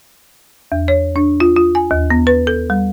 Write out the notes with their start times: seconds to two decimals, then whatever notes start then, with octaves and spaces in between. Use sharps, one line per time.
0.72 E2
0.88 C#5
1.16 D4
1.40 F4
1.56 F4
1.75 G#5
1.91 D#2
2.10 B3
2.27 B4
2.47 A4
2.70 G3